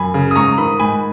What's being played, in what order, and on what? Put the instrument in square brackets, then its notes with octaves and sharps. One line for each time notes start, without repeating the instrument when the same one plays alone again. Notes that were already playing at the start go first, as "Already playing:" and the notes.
Already playing: [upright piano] F#2 G#5 B5
C#3
D#6
G#2 A#5 C#6
D#3 B5 D#6
G#2 G#5 B5